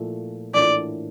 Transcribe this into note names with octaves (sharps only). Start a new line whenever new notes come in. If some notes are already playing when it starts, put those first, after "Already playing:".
Already playing: A#2 F3 A3 E4
A2 E3 A#3 D4 F4 D5